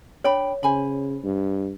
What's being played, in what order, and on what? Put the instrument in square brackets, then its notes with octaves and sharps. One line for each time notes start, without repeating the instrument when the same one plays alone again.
[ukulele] D4 G5 B5 [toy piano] C#5
[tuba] C#3 [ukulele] C5 G#5 B5
[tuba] G2